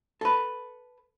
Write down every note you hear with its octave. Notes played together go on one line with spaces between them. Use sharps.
A4 B4